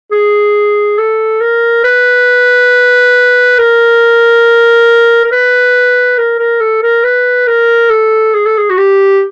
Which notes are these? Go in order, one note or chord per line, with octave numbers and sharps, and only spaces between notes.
G#4
A4
A#4
B4
A#4
A#4
B4
A#4
A#4
A4
A#4
B4
A#4
A4
G#4
A4
G#4
F#4
G4